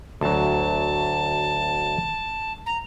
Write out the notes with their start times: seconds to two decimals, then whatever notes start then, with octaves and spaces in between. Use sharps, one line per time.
0.21 D2 F#3 A5
2.66 A#5